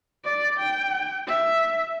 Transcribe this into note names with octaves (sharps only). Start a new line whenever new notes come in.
D5
G5
E5